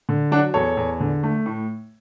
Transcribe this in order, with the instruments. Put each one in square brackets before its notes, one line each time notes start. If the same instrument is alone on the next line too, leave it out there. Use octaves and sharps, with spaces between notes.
[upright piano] D3
F#3 D4 F#4
E2 A4 C#5
E2
D3
A3
A2